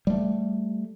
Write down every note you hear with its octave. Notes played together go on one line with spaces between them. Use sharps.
G3 A3